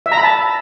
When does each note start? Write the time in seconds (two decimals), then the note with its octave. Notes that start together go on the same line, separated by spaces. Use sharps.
0.06 E5
0.12 A#5
0.17 B5
0.23 A5